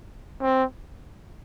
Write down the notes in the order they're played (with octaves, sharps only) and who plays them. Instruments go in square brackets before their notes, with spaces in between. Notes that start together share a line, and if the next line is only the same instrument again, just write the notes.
[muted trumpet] C4